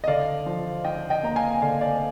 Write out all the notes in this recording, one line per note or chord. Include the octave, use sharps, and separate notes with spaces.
D#5
D3 D5 F5
F3
D#4 D#5 G5
D#5 G5
A#3 A#5
F5 G#5
D3 D5 F5
D5 F5